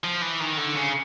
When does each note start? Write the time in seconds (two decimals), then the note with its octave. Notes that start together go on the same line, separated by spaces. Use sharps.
0.04 F3
0.22 E3
0.41 D#3
0.58 D3
0.76 C#3